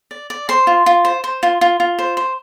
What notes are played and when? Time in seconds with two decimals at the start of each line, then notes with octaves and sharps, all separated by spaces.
0.11 D5
0.30 D5
0.49 C5 C6
0.67 F4
0.86 F4
1.05 C5
1.24 C5
1.43 F4
1.61 F4
1.80 F4
1.99 C5
2.17 C5